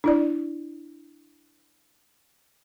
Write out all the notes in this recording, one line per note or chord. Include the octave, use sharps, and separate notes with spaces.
D4 E4 D5